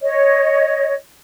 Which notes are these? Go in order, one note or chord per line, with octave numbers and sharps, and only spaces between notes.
C#5 D#5